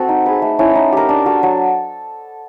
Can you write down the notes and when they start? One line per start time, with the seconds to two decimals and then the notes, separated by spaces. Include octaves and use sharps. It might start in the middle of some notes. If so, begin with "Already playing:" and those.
Already playing: C4 F#4 A4
0.09 D#4
0.26 G#4 B4
0.42 A3
0.59 C#4 E4 A4
0.75 D#4
0.92 G4 A#4
1.09 D4
1.26 F#4 A4
1.43 F#3